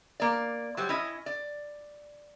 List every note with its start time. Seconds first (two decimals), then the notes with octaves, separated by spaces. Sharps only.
0.20 A#3 D5
0.77 F#3 G3 C5
0.89 C#4 E4 D#5
1.26 D5